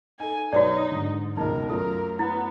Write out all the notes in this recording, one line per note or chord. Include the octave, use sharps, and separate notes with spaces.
D#4 A4 G#5
B1 D#4 F#4 B4 C#5 D5
G#2 D3
G#1 C#2 B2 D#4 A#4
F#2 A3 F4 A4 A#4
B3 E4